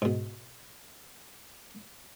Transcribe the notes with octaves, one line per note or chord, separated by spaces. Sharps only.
G#2 B2